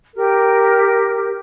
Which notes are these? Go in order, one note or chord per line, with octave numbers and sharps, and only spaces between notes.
G4 A#4